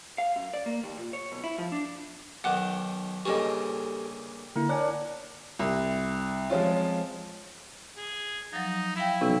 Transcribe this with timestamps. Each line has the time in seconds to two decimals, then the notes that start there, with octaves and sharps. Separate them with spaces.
0.18 F5
0.36 F#2
0.54 D5
0.66 A#3
0.83 D#2
0.99 A#2
1.13 C#5
1.32 B1
1.44 E4
1.58 F3
1.72 D4
2.44 B1 D#3 F#5 D6 F#6
3.25 G2 A#2 C#3 G4 A4 D#5 C#6
4.56 D3 A#3 E4 A#4
4.69 D4 C#5 F#5 G#5
5.59 C2
6.50 F3 G#3 C4 C#4 F4
7.97 G#4
8.53 F3 F#3 D#4
8.96 E4 E5 F5 G5
9.21 B1 C3 E3 C#4